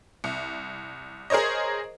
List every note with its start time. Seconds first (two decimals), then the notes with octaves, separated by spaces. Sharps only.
0.24 C2
1.30 G#4 A#4 C5 C#5 D#5